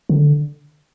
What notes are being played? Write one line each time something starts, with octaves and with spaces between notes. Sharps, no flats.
D3